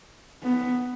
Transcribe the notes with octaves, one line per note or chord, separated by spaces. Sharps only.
B3